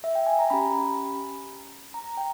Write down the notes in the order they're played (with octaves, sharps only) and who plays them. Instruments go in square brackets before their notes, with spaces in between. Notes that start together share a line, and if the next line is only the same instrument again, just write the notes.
[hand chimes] E5
G5
G#5
A#5
C#4 G4 B5
A#5
G5